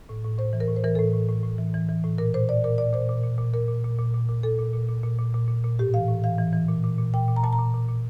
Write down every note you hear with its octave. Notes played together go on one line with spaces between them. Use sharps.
A2
A2
A2 C5
E3
A#4
A2
C5
E3 A#4
A4
A2
A2
A2
A2
E3
E3
E3
A2
A#2 A#4
A#2 C5
A#2 D5
A#2 A#4
A#2 D5
A#2 C5
A#2
A#2
A#2
A#2 A#4
A#2
A#2
A#2
A#2
A#2
A#2 A4
A#2
A#2
A#2
A#2
A#2
A#2
A#2
A#2
A2 G4
E3 F5
A2
E3 F5
E3
E3
A#2
A#2
A#2
A#2 G5
A#2
A#5
A#2 A5
A#5
A#2
A#2
A#2